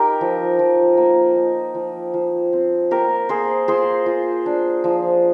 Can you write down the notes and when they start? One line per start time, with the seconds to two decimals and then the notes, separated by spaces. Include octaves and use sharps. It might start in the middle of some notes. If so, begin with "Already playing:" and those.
Already playing: D#4 G4 A#4
0.21 F3
0.59 F3
0.97 A#3
1.36 D#4
1.75 F3
2.14 F3
2.53 C4
2.91 A#3 G4 A#4
3.29 A#3 G#4 C5
3.68 F4 G#4 C5
4.06 F4
4.46 D4
4.84 F3